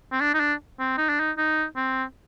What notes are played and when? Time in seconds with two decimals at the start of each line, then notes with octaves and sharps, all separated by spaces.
0.12 C4
0.21 D4
0.34 D#4
0.40 D4
0.79 C4
0.97 D#4
1.09 D4
1.19 D#4
1.37 D#4
1.76 C4